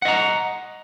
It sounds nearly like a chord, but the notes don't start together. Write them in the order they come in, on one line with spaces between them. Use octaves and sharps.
F#5 D#5 A#5